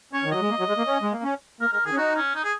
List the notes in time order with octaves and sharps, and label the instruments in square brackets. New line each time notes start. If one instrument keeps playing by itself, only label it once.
[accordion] C#4 [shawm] C#5
[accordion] D#3
[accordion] F#3 [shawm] D#5
[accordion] G#3
A#3
F#3
G#3
A#3
C#4
G#3
A#3
C#4
[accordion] A#3 [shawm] A#4
[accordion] G#3 [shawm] A#4
[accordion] D#3 [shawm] G#4
[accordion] C#4
[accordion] D#4 [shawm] F#4
[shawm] C#4
D#4
G#4